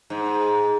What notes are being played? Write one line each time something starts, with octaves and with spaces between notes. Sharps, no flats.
G#2